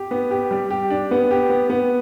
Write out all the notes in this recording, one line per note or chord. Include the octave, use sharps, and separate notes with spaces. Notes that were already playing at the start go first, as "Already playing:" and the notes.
Already playing: G4
B3
G4
G3
G4
D4
B3
G4
B3
B3